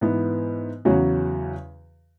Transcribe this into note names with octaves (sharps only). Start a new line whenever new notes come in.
G#2 E3 B3
E2 C#3 F#3 C#4 F#4